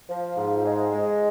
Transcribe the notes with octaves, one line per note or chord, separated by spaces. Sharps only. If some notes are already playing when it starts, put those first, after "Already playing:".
F3
G#2
G#3
G#3